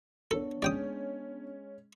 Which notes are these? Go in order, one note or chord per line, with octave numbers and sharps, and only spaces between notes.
B3 D4 A4 C#5
G#3 C#4 D5 G5 D#6